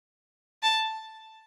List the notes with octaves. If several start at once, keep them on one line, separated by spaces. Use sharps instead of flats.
A5